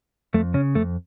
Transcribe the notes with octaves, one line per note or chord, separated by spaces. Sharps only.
F2 A3
C#3 C#4
F2 A3